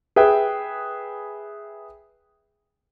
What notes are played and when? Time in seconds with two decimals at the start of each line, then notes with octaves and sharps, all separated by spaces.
0.16 G#4 B4 E5 G5